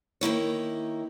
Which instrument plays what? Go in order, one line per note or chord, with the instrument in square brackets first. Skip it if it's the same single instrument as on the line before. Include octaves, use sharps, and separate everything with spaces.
[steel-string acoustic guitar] D#3 A#3 E4 C#5